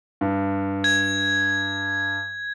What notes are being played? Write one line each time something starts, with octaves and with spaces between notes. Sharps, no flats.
G2
G#6